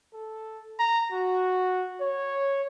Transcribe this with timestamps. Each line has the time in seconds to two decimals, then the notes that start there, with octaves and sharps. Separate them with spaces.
0.14 A4
0.79 A#5
1.12 F#4
2.01 C#5